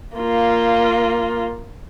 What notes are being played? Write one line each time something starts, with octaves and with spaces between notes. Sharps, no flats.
A#3 F4